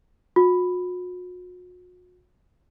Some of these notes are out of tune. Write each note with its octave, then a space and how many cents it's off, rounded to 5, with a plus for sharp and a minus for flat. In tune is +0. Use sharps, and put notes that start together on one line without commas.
F#4 -40